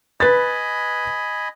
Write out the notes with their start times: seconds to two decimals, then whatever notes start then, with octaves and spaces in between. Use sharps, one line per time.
0.20 B4 D#5 G#5 B5 A6